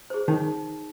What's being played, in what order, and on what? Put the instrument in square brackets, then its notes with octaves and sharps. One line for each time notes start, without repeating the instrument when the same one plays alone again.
[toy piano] G#4 C5
[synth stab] D#3 [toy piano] D#4